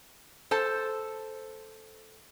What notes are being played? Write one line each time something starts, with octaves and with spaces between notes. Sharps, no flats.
A4 C5 A5